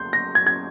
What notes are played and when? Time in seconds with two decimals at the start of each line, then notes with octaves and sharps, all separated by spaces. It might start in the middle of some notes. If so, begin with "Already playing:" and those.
Already playing: C6 G6
0.13 A#6
0.35 G#6
0.47 G#6